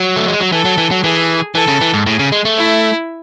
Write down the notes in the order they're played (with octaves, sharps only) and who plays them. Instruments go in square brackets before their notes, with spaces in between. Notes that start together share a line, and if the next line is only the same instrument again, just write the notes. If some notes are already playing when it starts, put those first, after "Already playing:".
Already playing: [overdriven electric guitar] F#3
A3
G#3
F#3
[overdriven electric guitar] E3 [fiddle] A4
[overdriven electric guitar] F#3
E3
F#3
[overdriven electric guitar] E3 [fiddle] G#4
[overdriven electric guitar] E3 [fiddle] A4
[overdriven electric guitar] C#3
E3
G#2
[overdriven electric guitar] A2 [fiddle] G#4
[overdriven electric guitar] C#3
G#3
A3
[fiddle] E4